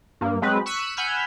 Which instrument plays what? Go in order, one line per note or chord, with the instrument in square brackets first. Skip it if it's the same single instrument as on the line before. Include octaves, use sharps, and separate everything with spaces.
[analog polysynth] G2 A#3
F#3 G#3 C4 B4
C#6 E6 F#6 B6 C#7 D#7
F#5 G#5 B5 E6 F6 G6